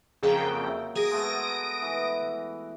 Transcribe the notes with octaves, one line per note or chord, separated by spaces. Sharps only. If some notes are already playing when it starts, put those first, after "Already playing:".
F2 C#3 F#3 A#3 G#4 D#5 F5 G5
C#5 E5 E6
G#4 D#6 A#6 D7
G#3 A3 B3
E3